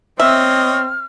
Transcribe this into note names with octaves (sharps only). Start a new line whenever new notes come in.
C4 C#5 D#5 E5 F6